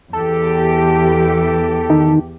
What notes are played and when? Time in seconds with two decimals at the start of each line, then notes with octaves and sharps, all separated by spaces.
0.13 E2 G4 A4
1.90 D#3